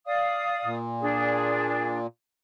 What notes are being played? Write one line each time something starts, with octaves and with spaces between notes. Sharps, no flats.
D5 F5 D#6
A#2
D4 G#4